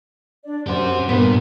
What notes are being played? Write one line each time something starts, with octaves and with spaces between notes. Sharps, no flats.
D4 D5
F#2 C#4 G4 C5 F#5 C6
G2 A#2 B3 A#4 C6